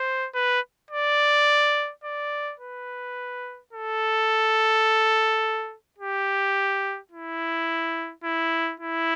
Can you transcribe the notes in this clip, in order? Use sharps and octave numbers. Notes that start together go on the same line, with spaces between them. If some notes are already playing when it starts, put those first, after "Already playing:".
Already playing: C5
B4
D5
D5
B4
A4
G4
E4
E4
E4